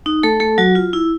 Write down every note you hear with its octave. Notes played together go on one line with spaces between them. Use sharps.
D#4
A3 A4
A3 A4
F#3 F#4
F4
E4